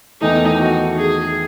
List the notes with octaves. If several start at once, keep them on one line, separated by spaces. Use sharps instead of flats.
E2 D#3 A3 D#4
F#4
G#4